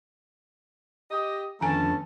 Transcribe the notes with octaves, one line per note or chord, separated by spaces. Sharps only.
G4 D#5
F2 D3 D#3 A3 B3 C#4 G#5 A5